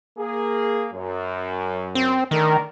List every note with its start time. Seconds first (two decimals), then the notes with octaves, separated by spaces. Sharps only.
0.18 A#3 G#4
0.92 F#2
1.95 C4
2.31 D#3 A3 D4 A#4